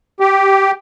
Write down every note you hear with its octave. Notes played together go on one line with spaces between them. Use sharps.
G4